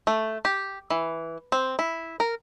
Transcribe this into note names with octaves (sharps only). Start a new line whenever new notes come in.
A3
G4
E3
C4
E4
A#4